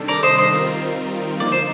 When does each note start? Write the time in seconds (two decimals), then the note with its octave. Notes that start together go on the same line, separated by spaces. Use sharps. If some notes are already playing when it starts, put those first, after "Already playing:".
Already playing: C3 D#3 G3 D4 A4
0.08 A#4 D5
0.23 C5 D#5
0.38 C5 D#5
0.52 D#3 G3 C4 F4 A#4
1.40 D3 F3 A#3 D#4 D5
1.52 C5